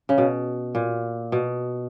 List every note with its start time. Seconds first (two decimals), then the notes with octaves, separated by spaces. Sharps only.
0.09 C#3
0.18 B2
0.75 A#2
1.32 B2